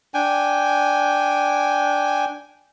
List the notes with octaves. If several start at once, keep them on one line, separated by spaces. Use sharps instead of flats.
D4 G5 G#5